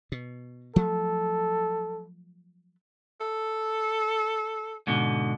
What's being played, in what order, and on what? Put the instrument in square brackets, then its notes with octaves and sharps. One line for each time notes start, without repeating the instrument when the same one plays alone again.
[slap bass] B2
[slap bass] F3 F#3 A3 [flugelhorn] A4
[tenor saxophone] A4
[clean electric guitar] G#2 B2 D3